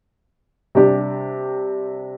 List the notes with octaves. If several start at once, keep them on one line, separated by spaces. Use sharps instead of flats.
C3 G3 D4 G4